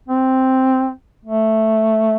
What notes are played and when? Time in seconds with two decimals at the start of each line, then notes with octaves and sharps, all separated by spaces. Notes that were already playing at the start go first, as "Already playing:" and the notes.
0.09 C4
1.25 A3